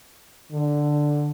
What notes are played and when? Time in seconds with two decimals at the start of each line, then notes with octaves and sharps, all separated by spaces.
0.52 D3